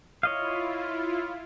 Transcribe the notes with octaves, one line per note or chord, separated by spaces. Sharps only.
E4 F4 C#5 D#5 F5